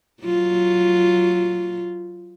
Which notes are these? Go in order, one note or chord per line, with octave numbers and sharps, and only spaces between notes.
F#3 F4